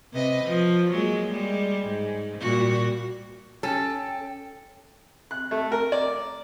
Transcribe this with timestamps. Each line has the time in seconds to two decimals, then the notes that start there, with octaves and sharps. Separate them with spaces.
0.13 C3 B4 D#5
0.45 F3
0.91 F#3 G#3 A#3
1.31 G3 G#3
1.87 G#2
2.40 A#2 G3 F#4
3.63 C#4 A4 G5
5.31 F#6
5.51 A3
5.72 A#4
5.92 D5